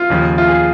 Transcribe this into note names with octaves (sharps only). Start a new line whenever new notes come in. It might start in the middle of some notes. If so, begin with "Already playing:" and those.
Already playing: F4
D#2 C#3 F3
F4
G#4